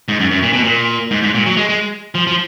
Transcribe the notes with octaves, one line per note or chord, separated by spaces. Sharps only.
G#2
F#2
F#2
A#2
B2
A#2
G#2
G#2
A#2
F#3
G#3
G#3
F3
F3